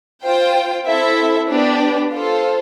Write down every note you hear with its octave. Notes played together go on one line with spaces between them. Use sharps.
F4 C5 G5
C4 E4 A4 E5
B3 D4 G4 B4 D5
F4 A4 C5